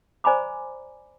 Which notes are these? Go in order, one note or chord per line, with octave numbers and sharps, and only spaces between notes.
C5 D5 G#5 A#5 B5 D6